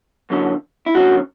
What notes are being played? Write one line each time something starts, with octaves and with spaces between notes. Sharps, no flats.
F#2 D3 F#3 C#4
E4
F#2 D3 F#3 C#4 F#4